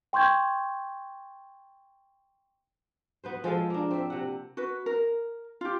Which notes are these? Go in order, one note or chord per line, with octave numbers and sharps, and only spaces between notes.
G5 C6 C#6 G6 G#6
B3 B4 C5
F3 G#3 A4 F5
A#3 D4
C4 E5
C3 F#5
F#4 B4
A#4
F4 G4